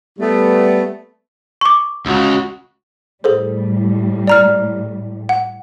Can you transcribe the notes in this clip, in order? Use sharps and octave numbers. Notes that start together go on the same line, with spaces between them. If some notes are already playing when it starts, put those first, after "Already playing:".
G3 A3 B3
C#6 D6
C#2 C#3 F#4
A2 G3 G#4 A4 C5
D5 A#5 F6
F#5